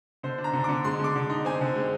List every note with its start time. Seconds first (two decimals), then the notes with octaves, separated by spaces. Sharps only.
0.23 D3 C5
0.38 D4
0.44 A#5
0.53 D3
0.64 D3 D6
0.84 G#3 C6
0.99 D3 D6
1.16 D3
1.30 D#4
1.45 C4 G#5
1.61 D3
1.75 G#3